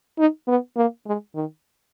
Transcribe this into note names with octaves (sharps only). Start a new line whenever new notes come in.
D#4
B3
A#3
G#3
D#3